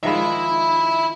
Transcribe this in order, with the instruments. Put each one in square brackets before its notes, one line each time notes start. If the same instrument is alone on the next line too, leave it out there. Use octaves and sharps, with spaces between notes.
[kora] D#3 F3 G#3 [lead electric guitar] E5 B5